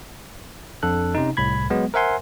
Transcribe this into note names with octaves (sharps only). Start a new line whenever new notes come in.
F2 D4 A4 F#6
C3 C#4 D#4
C2 A2 B5 G#6
F#3 G#3 B3
A#4 C5 E5 F#5 G#5 C6